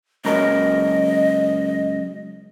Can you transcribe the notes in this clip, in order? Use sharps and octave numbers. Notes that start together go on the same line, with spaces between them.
C#2 F#2 A#4 D#5